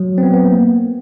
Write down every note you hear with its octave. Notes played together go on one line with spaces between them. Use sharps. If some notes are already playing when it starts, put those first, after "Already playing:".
Already playing: F#3
C4
B3
B3
A#3